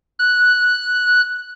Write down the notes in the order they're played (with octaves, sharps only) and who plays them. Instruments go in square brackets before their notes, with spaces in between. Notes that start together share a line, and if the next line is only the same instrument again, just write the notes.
[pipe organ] F#6